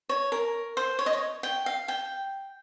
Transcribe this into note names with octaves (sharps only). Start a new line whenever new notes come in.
C#5
A#4
C5
C#5
D#5
C#5
G5
F5
G5